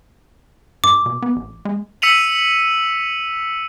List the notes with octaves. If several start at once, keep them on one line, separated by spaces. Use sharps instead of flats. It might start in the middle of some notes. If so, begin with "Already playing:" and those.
G2 D6
B2
B3
A1
G#3
E6 B6 C#7 D#7 F7 F#7